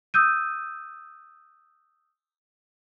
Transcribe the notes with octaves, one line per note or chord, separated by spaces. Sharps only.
D#6 E6 G6 D#7